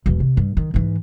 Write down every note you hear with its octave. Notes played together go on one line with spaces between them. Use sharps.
E1 E3
C3
G2
D#3
G#2 E3